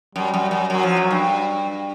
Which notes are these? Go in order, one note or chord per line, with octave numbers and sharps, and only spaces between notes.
F#2 G3
F#2
F#2
F#2 F#3
F3
F#2
G2